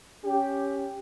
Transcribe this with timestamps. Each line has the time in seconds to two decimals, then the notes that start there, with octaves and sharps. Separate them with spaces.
0.23 C#4 G4